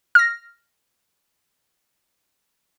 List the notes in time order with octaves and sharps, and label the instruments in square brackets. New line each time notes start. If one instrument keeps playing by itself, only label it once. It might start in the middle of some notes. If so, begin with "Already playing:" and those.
[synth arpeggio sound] F6 A#6